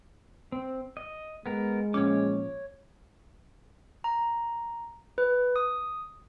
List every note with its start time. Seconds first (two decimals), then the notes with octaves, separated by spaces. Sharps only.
0.52 C4
0.97 D#5
1.46 G#3 B3 A#4
1.94 A#2 F3 C#4 C#5 D6
4.04 A#5
5.18 B4
5.56 D#6